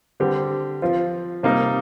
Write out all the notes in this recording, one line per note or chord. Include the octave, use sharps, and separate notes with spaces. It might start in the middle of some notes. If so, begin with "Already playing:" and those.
D3 G3 C4 G4
F3 C4 F4
C3 G3 A#3 D#4